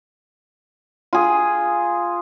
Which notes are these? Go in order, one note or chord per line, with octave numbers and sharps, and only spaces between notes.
F4 G#4